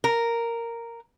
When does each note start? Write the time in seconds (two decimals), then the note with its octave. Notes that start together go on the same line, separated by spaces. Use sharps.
0.04 A#4